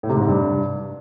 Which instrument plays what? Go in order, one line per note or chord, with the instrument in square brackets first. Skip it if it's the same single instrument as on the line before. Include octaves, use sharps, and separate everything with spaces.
[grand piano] A2
C3
G#2
C3
G2